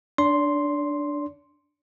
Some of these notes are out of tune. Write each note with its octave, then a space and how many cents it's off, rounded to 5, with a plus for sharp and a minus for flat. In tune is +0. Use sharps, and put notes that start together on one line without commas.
D4 +0 D5 -40 C6 +0